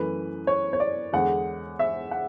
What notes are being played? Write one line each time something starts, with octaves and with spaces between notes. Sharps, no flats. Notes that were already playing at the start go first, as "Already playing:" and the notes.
Already playing: F#2 E3 A3 B4
C#5
C#5
D5
E2 D3 G#3 F#5
E5
F#5